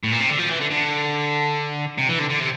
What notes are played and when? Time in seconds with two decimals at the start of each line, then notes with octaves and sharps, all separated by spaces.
0.04 A2
0.12 A#2
0.21 C3
0.30 D3
0.39 F3
0.51 E3
0.61 D3
0.71 D3
1.98 C3
2.09 E3
2.19 D3
2.30 D3
2.40 C3